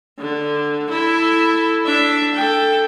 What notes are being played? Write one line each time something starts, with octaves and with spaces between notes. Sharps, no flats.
D3
E4 A4
D4 E5
A4 G5